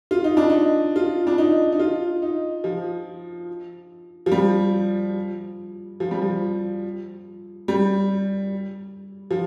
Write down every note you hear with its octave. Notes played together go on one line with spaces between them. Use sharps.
F4
D#4
D4
D#4
F4
D4
D#4
D#4
F4
D#4
F3
F3
G3
F3
G3
F3
G3
F3